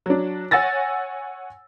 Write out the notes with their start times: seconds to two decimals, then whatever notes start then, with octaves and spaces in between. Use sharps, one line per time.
0.06 F#3 D4
0.51 C#5 F#5 G#5 E6 A6 A#6